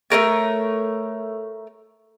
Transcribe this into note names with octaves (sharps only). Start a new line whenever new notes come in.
A3 C#4 A#4 C#5